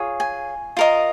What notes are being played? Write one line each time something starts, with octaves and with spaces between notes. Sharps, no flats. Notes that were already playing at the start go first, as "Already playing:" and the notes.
Already playing: F4 G#4 C#5
G#5
F4 A#4 D#5